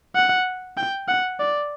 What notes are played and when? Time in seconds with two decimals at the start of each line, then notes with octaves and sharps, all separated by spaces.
0.15 F#5
0.77 G5
1.08 F#5
1.40 D5